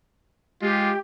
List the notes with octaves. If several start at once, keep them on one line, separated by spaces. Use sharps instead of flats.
G#3 F4 G4